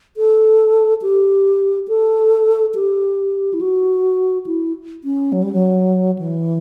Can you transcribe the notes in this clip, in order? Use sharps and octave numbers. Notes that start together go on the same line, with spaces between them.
A4
G4
A4
G4
E4
F#4
E4
C#4
F#3
G3
F#3
E3